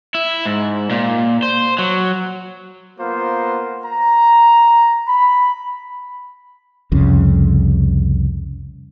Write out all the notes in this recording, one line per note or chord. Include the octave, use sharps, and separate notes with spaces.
E4
G#2
A#2
C5
F#3
A#3 B3 F4 A#4 C5
A#5
B5
C2 F2 C#3